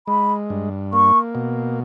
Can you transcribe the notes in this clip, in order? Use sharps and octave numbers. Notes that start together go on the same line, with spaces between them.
G#3 B5
G2
A#3 C#6
B2